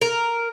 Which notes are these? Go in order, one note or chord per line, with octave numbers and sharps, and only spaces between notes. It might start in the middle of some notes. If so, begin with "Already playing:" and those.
A#4